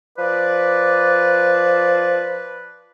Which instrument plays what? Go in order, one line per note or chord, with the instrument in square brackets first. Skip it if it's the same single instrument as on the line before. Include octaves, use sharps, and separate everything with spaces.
[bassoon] F3 [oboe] B4 [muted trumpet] D5